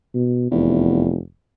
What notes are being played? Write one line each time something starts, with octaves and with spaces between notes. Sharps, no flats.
B2
F1 E2